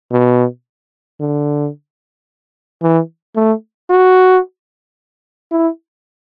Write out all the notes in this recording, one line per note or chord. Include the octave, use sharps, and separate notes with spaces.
B2
D3
E3
A3
F#4
E4